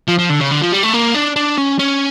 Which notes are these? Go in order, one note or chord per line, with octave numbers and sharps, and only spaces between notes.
F3
F3
D3
C#3
D3
F3
G3
A3
A#3
D4
D4
C#4
C#4